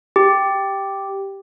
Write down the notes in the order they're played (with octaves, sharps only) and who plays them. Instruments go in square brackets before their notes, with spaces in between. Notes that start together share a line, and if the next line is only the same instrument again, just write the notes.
[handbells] G4